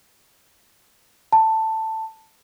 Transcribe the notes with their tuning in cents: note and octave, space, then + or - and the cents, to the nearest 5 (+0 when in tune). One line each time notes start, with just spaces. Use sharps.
A5 +10